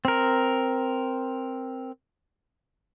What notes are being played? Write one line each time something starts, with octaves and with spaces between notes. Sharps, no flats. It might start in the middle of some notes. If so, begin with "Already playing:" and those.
C4 A#4